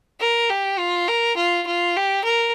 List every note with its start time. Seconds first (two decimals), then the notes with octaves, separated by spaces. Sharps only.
0.20 A#4
0.49 G4
0.78 F4
1.08 A#4
1.37 F4
1.66 F4
1.96 G4
2.24 A#4